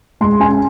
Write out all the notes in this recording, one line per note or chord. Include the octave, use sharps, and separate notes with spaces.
G#3 C6
C#4 G#5